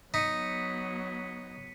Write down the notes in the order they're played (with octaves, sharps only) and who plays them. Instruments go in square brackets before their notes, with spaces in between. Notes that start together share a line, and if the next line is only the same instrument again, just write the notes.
[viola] F#3 B3 [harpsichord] D#4 [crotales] B6 C#7 D#7